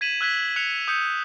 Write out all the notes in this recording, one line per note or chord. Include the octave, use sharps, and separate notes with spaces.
G#6 B6 D#7 E7 F#7
E6 F#6 G#6 B6
F#6 C#7 F7
D#6 G6 C#7